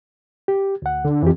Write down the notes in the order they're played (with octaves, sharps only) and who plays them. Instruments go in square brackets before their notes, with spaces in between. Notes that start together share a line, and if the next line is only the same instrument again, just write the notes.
[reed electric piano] G4
D2 F#5
[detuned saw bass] D3
[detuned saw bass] F2 [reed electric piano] E3 G4